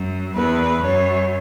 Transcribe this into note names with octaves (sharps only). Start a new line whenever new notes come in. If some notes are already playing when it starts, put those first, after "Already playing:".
Already playing: F#2
E2 B4
F#2 C#5